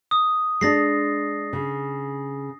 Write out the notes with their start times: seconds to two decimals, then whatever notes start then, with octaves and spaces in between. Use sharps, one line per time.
0.11 D#6
0.61 G#3 D4 A6 A#6 C7
1.53 C#3